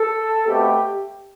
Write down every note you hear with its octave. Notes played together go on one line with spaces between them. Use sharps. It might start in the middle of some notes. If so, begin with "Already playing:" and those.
Already playing: A4
B2 A3 C4 G4